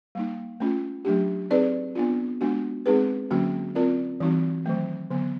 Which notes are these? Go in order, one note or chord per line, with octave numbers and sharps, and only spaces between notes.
G3 A#3 D#4
A3 C#4 F4
F#3 A3 D4 G4
C4 D#4 G#4 B4 D5
B3 D4 F4
G#3 B3 D4 F#4
G#3 C4 D#4 G#4 B4
D3 F#3 A#3 C#4 F#4
C4 F4 A#4 D5
E3 G3 C4 D#4 F#4
D#3 F#3 A3
D3 F#3 B3